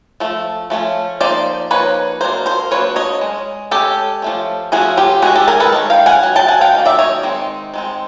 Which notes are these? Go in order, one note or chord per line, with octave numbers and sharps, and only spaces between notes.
F3 A3
F3 A3 C#4
F3 A#3 D#4 C5 D5
F3 A#3 D#4 B4 C#5
F#3 A#3 D4 A#4 C5
A#4 C5
F#3 A#3 D4 B4 C#5
C#5 D#5
G#3 C#4
G#3 C#4 G4 A4
F3 A3 C#4
F3 A3 C#4 F#4 G#4
F4 G4
D#3 G#3 C#4 F#4 G#4
G4 A4
G#4 A#4
A4 B4
D#3 G#3 C#4
F5 G5
F#5 G#5
D#3 F#3
G5 A5
F#5 G#5
F5 G5
D#3 F#3 A#3
D5 E5
C#5 D#5
D#3 G#3 C4
D#3 G#3 C4